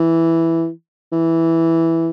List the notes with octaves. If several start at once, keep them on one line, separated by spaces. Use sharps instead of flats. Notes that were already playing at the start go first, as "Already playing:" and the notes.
Already playing: E3
E3